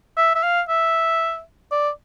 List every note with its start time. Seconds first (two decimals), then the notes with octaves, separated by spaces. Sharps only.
0.17 E5
0.35 E5
0.43 F5
0.69 E5
1.72 D5